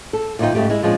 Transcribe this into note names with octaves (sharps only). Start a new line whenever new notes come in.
A4
D2 A#2 F3 D#4 F4 G5
G#2 C#3 A3 G4
G#3 E4
A#2 F3 G#3 C#4 D4